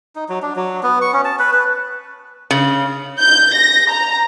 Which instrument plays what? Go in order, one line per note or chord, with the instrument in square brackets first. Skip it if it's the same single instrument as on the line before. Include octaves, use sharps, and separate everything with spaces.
[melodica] D#4
F#3
D4
F#3
B3
C#6
C#4
A5
B4
B4
[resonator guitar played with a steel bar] C#3
[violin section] G6
A#6
A#5